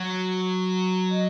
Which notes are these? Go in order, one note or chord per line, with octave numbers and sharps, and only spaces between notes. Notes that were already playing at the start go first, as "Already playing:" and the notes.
Already playing: F#3
D#5